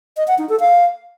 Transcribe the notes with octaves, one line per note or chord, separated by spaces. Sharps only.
D#5
F#5
D#4
A4
F5